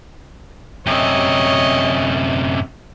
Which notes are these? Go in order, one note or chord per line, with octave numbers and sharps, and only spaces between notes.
F#2 C3 C#5 D#5